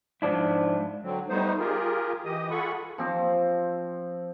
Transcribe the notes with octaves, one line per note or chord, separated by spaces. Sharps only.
G#2 F3 D4 E4
D3 F#3 C4
G3 A3 B3 D#4 C5
F4 G4 G#4 A#4
E3 G4 D#5 D#6
F4 G#4 A4 F#5 B5 C#6
F3 C4 D6